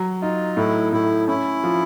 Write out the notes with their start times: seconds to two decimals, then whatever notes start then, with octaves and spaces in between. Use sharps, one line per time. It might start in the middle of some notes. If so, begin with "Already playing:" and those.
Already playing: F#3
0.22 D#4 F4
0.57 A2 E4
0.92 A2 E4
1.28 C#4 E4
1.64 F3